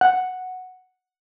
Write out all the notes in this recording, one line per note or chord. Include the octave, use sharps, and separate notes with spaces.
F#5